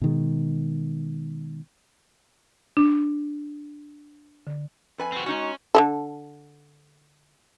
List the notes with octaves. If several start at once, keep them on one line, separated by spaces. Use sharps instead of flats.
B2 D#3 G#3
D4
D3
F2 B4 G#5
C4 F#4
G#3 C#4 D#4 F#4
D3 G#3 A4